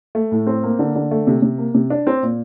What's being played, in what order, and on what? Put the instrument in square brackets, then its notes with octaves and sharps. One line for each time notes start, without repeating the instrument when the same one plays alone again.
[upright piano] A3
A2
C4
A#3
D3
D3
A3
C3
C3
A#3
C3
D4
C4
A#2